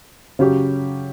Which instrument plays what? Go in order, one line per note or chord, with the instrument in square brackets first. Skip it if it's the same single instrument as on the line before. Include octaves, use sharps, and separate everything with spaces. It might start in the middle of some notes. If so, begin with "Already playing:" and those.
[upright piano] C#3 F#3 C#4 G4